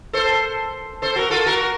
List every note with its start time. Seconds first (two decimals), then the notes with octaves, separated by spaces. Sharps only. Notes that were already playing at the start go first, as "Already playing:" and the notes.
0.13 A4 C5
1.02 A4 C5
1.16 F#4 A#4
1.31 F4 A4
1.46 F#4 A#4